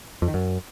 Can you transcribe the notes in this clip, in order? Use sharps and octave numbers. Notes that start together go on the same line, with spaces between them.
F2
D#3
F#2